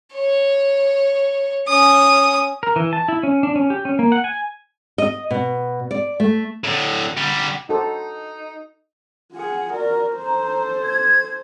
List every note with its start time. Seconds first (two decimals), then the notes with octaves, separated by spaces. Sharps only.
0.14 C#5
1.67 C#4 D#6
2.63 A#4
2.76 E3
2.93 A5
3.08 E4
3.23 C#4
3.43 D4
3.56 C#4
3.70 G4
3.85 C#4
3.99 A#3
4.12 F#5
4.24 G#5
4.98 D#5
5.31 B2
5.91 D5
6.20 A3
6.64 A2 D3
7.17 D3 G3
7.69 D#4 F#4 A4 C5
9.33 F4 G#4 F#5
9.73 F#4 A#4 D5
10.16 A4 C5 A#5
10.82 G#6